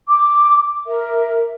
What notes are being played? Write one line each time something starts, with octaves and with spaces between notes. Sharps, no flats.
D6
A#4 E5